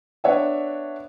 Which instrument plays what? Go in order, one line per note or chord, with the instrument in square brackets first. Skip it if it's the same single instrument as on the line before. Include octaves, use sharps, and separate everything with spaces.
[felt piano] B3 D4 C#5 E5 F#5